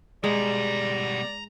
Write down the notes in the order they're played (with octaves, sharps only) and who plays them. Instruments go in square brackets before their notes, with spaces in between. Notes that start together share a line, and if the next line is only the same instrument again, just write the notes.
[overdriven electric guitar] B2 G3 [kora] G#3 [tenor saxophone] D5 [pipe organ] A#5